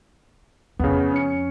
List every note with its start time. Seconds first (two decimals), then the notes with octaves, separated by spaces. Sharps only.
0.79 F2 C#3 B3
1.14 C#4 C#7